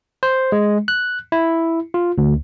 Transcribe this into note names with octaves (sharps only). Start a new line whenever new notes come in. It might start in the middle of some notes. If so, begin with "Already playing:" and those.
C5
G#3
F#6
E4
F4
D2